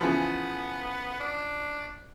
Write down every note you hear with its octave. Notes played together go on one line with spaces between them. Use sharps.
C#3 E3 F3 B3
D4